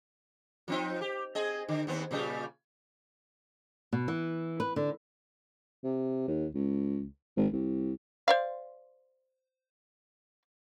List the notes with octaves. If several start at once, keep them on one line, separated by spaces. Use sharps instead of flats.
F3 C4 D#4
G4
C4 G#4 D#5
D3
D#2 B3 C4
A#2 C#3 G3
B2
E3
B4
D3
C3
D#2
C#2
G#1
C2
C5 D5 F5